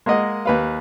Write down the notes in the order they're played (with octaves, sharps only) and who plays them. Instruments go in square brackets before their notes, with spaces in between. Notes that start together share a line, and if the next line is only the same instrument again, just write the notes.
[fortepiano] G#3 A#3 A#4 D#5 F#5
D#2 B4 F5